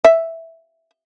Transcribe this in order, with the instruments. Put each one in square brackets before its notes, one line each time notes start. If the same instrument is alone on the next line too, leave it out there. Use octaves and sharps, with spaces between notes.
[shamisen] E5